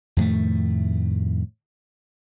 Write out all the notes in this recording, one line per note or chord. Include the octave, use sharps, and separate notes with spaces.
F2 A2 D#3 A3